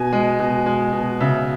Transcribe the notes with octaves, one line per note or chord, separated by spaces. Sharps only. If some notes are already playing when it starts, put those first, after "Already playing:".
Already playing: B2 G#5
G#3
B2
G#3
B2
C#3 E5